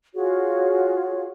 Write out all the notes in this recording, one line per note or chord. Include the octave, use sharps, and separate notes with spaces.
F4 F#4 G#4 C#5